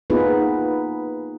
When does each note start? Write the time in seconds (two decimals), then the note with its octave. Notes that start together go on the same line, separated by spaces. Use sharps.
0.10 A#3 B3 D#4 F4 G#4 B4